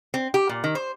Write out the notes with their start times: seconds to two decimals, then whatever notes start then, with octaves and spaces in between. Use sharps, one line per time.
0.14 C4
0.34 G4
0.49 A#2
0.64 D#3
0.75 C5